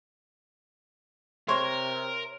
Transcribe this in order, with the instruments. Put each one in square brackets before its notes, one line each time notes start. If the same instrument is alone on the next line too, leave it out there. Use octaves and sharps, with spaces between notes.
[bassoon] C3 [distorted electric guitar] A#4 [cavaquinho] C5 C#5 [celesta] C6